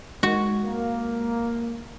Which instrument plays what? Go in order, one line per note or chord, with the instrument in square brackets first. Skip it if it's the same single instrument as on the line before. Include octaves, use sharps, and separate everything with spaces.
[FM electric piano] G#3 [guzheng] F#4
[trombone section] A#3